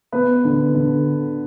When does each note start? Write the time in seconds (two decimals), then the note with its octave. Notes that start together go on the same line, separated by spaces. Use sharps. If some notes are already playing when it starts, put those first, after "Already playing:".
0.12 B3 B4
0.44 D3
0.75 D3